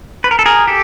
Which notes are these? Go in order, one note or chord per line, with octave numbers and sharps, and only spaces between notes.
B4
A#4
A4
G#4 A#4
G4 A4